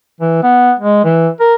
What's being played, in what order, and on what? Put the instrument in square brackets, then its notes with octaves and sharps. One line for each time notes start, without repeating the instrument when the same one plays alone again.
[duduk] E3
B3
G#3
E3
A#4